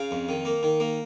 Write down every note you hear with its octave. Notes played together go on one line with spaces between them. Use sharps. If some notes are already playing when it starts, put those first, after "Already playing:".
Already playing: C#3 F5
F2
D#3
A#3
D#3
A#3